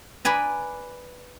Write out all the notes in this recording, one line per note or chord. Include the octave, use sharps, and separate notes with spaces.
B4 D5 G#5 A#5